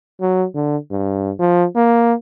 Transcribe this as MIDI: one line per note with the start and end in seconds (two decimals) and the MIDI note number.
0.21 0.44 54
0.55 0.77 50
0.91 1.31 43
1.39 1.65 53
1.76 2.14 58